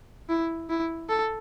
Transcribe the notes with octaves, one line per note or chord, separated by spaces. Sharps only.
E4
E4
A4